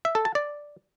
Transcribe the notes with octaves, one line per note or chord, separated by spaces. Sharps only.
E5
A4
A5
D5